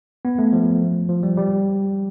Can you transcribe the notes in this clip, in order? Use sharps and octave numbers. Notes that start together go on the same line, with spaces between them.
B3
A3
F3
F3
G3
G3